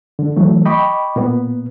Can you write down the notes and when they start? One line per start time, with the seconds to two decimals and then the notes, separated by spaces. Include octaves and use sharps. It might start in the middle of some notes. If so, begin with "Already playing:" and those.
0.19 D3
0.36 E3 F#3 A3
0.65 D#5 G5 B5 C#6 D6
1.16 A#2 B3